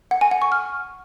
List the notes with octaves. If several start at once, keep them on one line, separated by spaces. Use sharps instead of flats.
F#5
G#5
F#5
C#6
F6